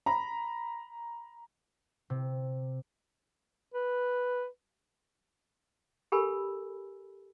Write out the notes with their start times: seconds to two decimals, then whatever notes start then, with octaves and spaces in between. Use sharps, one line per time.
0.06 A#5 B5
2.10 C3
3.74 B4
6.12 G4 A4 A#4 G#5 B5 E6